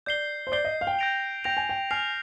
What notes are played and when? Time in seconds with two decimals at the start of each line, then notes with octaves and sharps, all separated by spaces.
0.06 D5 G6 C7 G7
0.47 C5
0.52 D5 G6 C7 G7
0.65 D#5
0.81 F5
0.87 G5
0.99 G6 A#6 D7 F7
1.44 G5 G6 A#6 D7 F7
1.57 G#5
1.69 G5
1.91 G#5 F6 C7 F7